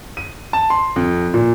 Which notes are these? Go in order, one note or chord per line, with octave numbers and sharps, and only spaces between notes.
D#7
A5
C6
F2
A#2